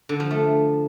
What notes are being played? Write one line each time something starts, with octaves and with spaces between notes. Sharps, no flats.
D3
F3
A3